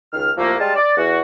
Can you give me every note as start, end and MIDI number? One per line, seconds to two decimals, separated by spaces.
0.13 0.30 37
0.13 0.30 51
0.13 0.30 89
0.38 0.54 36
0.38 0.54 53
0.38 0.54 57
0.38 0.54 58
0.60 0.73 55
0.60 0.73 56
0.60 0.73 65
0.60 0.73 81
0.76 0.95 74
0.97 1.21 40
0.97 1.21 66